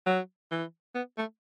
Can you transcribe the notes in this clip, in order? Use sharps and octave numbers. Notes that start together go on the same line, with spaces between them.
F#3
E3
B3
A3